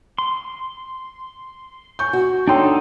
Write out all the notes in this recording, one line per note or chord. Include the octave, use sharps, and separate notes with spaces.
C6
G#5 C#6 G6
F#4
D4 D#4 A4 C#5 G5 C6